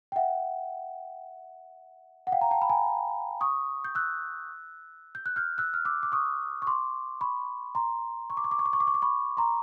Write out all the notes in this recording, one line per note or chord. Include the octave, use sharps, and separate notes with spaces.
G5
E5 F#5
F#5
F5 G5
A#5
G5 A5
B5
G#5 A#5
C#6 D#6
G6
E6 F#6
G6
F#6
F6 G6
E6 F#6
F6
D6 E6
D6
C#6 D#6
C#6
C6 D6
B5 C#6
A#5 C6
C#6
D6
C#6
D6
C#6
D6
C#6
D6
C#6
D6
B5 C#6
A#5 C6